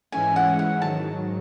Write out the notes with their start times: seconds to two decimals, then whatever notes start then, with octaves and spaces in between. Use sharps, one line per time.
0.12 G#2 E3 G#3 C#4 E4 G#5
0.36 F#5
0.59 F#5
0.82 G#2 D#3 F#3 A5